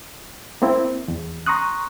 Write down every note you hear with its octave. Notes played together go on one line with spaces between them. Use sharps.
A#3 C4 E4
E2
A#5 C6 C#6 D#6 F#6